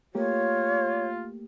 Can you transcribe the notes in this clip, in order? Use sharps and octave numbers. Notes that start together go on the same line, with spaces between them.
A3 A#3 F4 G4 C#5